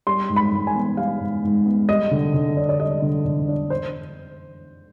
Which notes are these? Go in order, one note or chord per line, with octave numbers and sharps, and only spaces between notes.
G3 C6
G#2
B5
G#2
G#5
B3
G3 F5
G#2
G#2
B3
G3 D#5
D3
D3
D4
D5
G3 D#5
D3
D3
D4
C5